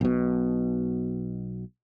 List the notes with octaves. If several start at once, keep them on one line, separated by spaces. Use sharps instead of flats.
B1 B2